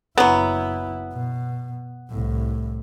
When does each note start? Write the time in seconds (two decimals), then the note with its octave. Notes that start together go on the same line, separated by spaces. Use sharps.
0.18 F#1 F#3 B3 E4
1.13 B2
2.09 C2 A2